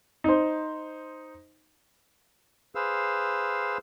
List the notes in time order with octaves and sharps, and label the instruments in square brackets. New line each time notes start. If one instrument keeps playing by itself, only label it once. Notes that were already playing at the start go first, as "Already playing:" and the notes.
[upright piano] D#4 C5
[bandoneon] G#4 B4 C5 F5 E6